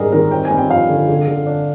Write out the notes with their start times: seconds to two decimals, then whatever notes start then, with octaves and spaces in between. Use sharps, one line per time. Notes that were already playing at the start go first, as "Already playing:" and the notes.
Already playing: G#2 G3 D4 G#4 A#4
0.12 D#3 A#4
0.31 C4 G5
0.45 G#5
0.51 G2
0.58 G5
0.69 F3 F5
0.89 D3
1.08 D3
1.28 D3
1.47 D4